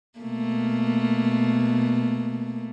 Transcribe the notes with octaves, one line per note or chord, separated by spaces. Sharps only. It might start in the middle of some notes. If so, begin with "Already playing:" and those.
B2 A3 A#3